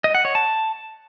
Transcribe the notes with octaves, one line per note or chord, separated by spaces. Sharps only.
D#5
F#5
C#5
A5